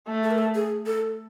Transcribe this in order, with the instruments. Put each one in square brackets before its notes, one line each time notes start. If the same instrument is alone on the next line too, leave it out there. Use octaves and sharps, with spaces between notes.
[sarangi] A3
[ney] A4
A#4
A4
G#4
A4